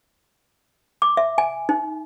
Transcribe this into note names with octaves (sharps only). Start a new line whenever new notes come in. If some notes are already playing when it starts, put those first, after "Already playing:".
D6
E5
G#5
D#4